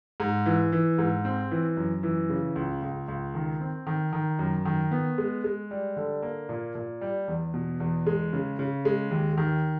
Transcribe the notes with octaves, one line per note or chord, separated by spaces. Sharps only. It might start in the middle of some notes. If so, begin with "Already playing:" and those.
G#2
E3
E3
G#2
C4
E3
F#2
E3
C#3
C#2
C#2
C#2
D#3
C4
D#3
D#3
F#2
D#3
B3
G#3
G#3
G3
D3
A#3
A#2
A#2
G3
E2
B2
E2
G#3
C#3
C#3
G#3
D#2
D#3